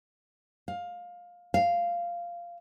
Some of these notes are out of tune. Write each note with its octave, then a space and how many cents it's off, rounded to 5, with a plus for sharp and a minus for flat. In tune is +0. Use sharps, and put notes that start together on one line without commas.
F5 +15
F5 -10